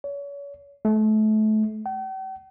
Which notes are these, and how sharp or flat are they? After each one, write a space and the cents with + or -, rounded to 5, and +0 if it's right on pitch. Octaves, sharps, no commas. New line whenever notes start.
C#5 +35
A3 -30
G5 -45